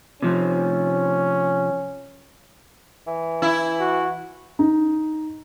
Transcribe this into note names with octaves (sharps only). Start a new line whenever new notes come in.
C3 F3 C#4
E3
E4
F#4
D#4